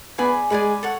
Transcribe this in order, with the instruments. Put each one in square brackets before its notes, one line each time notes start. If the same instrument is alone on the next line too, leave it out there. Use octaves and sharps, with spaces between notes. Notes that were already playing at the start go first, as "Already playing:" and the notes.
[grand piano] B3 [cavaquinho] G#4 D5 G#5 B5
[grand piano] G#3 [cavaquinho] G#4 D5 G#5 B5
[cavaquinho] A4 C#5 F#5